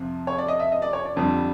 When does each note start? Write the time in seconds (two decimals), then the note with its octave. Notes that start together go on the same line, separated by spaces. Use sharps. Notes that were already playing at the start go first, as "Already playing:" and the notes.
Already playing: F2 C3 F3
0.27 C#5
0.38 D5
0.48 D#5
0.60 E5
0.72 D#5
0.82 D5
0.93 C#5
1.05 D5
1.16 F2 D3 G3